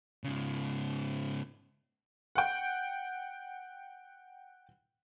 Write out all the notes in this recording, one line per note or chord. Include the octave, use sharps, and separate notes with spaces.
G#2 C#3
F#5 G5